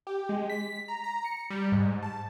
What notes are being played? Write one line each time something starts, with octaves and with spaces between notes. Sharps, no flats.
G4
G#3
B6
A#5
A#5
C#7
G3
G#2
A5